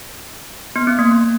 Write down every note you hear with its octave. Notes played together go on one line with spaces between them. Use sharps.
B3
C4
A#3